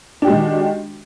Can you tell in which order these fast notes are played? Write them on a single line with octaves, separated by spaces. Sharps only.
D4 G4 F#4 G#3 D#3